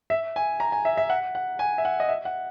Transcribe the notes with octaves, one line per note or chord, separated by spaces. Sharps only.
E5
G#5
A#5
G#5
E5
E5
F#5
F#5
G#5
E5
F#5
D#5
E5
F#5